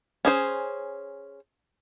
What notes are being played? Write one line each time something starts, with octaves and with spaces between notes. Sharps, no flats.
C#4 G#4 C5